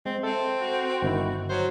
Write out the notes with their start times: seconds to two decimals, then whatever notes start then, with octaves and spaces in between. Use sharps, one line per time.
0.06 G#3 C4
0.23 C4 A4 E5
0.61 F#4
1.02 G1 D#3 E4
1.50 F#3 C5